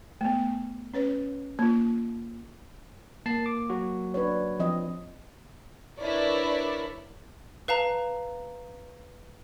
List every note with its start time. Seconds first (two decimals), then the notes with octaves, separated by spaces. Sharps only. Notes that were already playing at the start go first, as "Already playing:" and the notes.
0.21 A3 B3
0.93 C#4 B4 C#5
1.59 A#3 F4
3.26 A#3 A5 C7
3.46 D6
3.70 F#3 F#4
4.14 D4 B4 C#5
4.60 F3 C4 D#5
5.99 D4 E4 A#4 B4 C#5 D5
7.68 B4 F5 A5 A#5